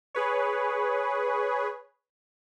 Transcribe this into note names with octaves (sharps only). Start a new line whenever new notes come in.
G#4 B4 C#5